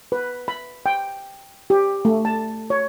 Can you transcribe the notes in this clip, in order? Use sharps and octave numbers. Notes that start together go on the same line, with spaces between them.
B4
B5
G5
G4
A3
A5
C#5